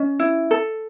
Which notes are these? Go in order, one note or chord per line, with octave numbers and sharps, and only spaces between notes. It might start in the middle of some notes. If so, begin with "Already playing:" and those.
Already playing: C#4 D#5
E4
A4